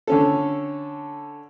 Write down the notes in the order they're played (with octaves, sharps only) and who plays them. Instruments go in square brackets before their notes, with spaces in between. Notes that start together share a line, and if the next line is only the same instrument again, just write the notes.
[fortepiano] D3 C#4 A4